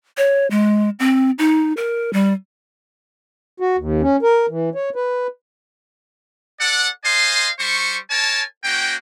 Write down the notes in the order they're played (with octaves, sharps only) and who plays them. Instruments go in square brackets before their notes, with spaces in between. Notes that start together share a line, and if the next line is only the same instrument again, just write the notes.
[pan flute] C#5
G#3
C4
D#4
A#4
G3
[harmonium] F#4
D#2
C#4
A#4
E3
C#5
B4
[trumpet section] A4 D5 F#5
C5 D#5 F5 G#5 C6
G3 C5 C#6
A#4 C#5 G#5 A5
A#3 C#4 F#4 G5